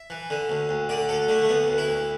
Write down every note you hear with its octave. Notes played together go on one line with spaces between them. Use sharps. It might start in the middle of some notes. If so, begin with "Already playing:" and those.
Already playing: E5
E3
D3
D2
D2
D3 D5
D2 A4
D3 A3
A3
D2 B3
D2
E4
D2